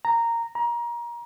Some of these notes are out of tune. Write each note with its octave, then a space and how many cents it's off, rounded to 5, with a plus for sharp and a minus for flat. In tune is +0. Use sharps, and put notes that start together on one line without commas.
A#5 -10
A#5 +25